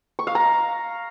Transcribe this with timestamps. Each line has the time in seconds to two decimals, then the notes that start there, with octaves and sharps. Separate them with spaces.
0.19 C#6
0.27 F5
0.35 A#5